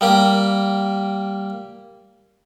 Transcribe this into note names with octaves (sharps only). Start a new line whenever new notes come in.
G3 A#3 G4